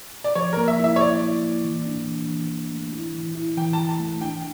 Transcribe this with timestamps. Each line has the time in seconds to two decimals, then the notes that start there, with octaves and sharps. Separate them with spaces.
0.24 D5
0.35 F3 C#5
0.53 A#4
0.57 A#3
0.68 E5
0.79 E4 E5
0.96 C#5
1.00 E4 D5
1.22 E4
1.44 A#3
1.65 E3
1.86 D4
2.07 E3
2.29 E3
2.50 D4
2.72 A3
2.93 E4
3.14 E3
3.35 E4
3.57 E3 G5
3.73 A5
3.78 E3
3.89 A5
4.00 A3
4.21 D4 G5